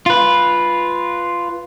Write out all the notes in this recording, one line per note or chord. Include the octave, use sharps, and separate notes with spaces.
F4 B4